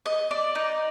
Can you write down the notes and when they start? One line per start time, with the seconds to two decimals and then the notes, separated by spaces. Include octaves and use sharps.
0.06 D#5
0.31 D5
0.55 D#4